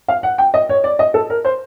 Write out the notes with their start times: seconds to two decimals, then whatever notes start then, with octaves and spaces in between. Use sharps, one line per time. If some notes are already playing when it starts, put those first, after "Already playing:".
0.08 F5
0.23 F#5
0.38 G5
0.54 D#5
0.69 C#5
0.84 D5
0.99 D#5
1.14 A4
1.30 A#4
1.45 C5